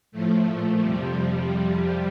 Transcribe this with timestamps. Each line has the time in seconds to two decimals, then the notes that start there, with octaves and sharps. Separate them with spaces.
0.12 A2 F3 A3
0.46 A#2 F3
0.81 F2 C3 F3 G3